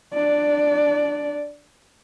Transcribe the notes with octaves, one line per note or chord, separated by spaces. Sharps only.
D4 D5